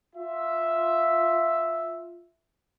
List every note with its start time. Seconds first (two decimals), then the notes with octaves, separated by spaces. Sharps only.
0.16 F4 E5